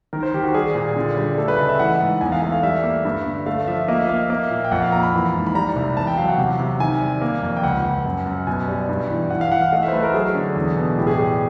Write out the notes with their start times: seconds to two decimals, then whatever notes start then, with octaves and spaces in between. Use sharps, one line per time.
0.13 D#3 A#4
0.23 C5
0.34 D#3 G4
0.44 F#4
0.54 G3 G#4
0.75 A#2
0.96 D3
1.17 G3
1.38 A3 A4
1.48 B4
1.58 C#3 D#5
1.69 E5
1.79 E3 F#5
2.00 G#2
2.21 E2 G#5
2.32 F5
2.42 A3 F5
2.52 F5
2.63 G3 E5
2.84 A#3
3.05 G2
3.26 D3
3.46 A3 F5
3.67 F3 E5
3.88 A#3 D#5
3.99 E5
4.09 A#3 F5
4.20 E5
4.30 A#3
4.51 A#2
4.64 G5
4.71 F2 F#5
4.82 F5
4.92 A#3 A#5
5.03 B5
5.13 E3
5.34 G#2
5.46 B5
5.55 G3 A#5
5.76 C2
5.97 E2 A5
6.07 G5
6.17 F#3 F5
6.28 F#5
6.38 C3
6.60 C3
6.80 D#3 G#5
7.01 G3
7.21 A#3
7.43 F2
7.57 G5
7.63 C#2 F#5
7.85 C#2
8.05 F#2
8.26 F#2
8.47 B2 G#5
8.68 G3
8.89 G2
9.10 E3
9.30 E3 F#5
9.41 F5
9.51 E3 F#5
9.62 F5
9.72 A3 D#5
9.83 E5
9.88 C5
9.93 A3 B4
10.03 A#4
10.14 F#3 G#4
10.35 D3
10.56 E2
10.76 B2
10.98 A2 G4
11.07 G#4
11.16 G3 G4